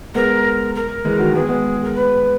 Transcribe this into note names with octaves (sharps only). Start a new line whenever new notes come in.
G#3 B3 A#4
A#4
E3 G#3
D#3 F#3
G#3 B3 G#4
G#3 B3
A#4
B4